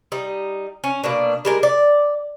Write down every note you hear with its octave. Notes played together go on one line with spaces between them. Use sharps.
G3 D#4
C#4
B2 A#3 D4
G3 G#3 A#4
D5